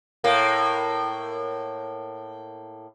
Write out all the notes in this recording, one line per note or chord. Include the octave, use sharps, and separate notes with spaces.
A2 A#3